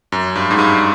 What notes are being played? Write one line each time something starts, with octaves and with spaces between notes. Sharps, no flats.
F#2
G2
G#2
G2